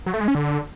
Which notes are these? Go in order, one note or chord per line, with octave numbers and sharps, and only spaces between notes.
F#3
A3
G#3
C#4
D3